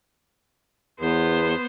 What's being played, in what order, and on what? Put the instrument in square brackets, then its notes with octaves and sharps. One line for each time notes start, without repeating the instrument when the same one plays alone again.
[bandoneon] E2 [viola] B3 C5